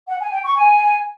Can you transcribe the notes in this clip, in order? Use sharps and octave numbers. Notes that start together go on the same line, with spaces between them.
F#5
G#5
G5
C#6
G#5